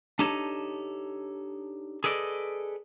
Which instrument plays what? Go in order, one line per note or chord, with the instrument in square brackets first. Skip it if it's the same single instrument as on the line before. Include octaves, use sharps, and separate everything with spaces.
[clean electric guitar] D4 D#4 G4 A4 C#5 D#5
G#4 A4 B4 D5 D#5